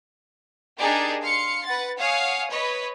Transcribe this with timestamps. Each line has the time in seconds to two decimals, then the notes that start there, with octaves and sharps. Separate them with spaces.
0.79 D4 D#4 G4 G#4 A#4 D5
1.23 F5 C6 C#7
1.65 B4 F#5 A6
1.99 C#5 F5 F#5 G#5 D#6
2.51 B4 C#5 D#5